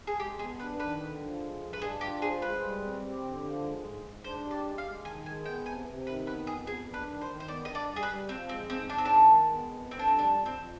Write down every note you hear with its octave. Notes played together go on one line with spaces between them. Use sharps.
G#4
G#3 G4
B3 G#4
D4 B4
D#3 B4
D3
F3
G#3
G2
B4
D4 G#4
F4 G4
G#4 C5
G#3 B4
G3
C4
G4
D3
F3
G#3
G#2
G#2
D4 C5
G4
D5
G#3
F5
G#3
D#3 G#5
G#3 G#5
B3 G5
C3 G#5
C3
D#3 B4
B3 B4
F2 G#4
B3 G#4
D4
B4
D#3
C5
D#3
C5
B3 D5
D4 D#5
D5
G3
G#4
B4
G3
F3 C4
G#3 C4
G#2 C4
G#2 D4
C4
D#3 D4
G#3
B3
F2
D3 C4
D4
C4
G3
D4
F2
C4
F2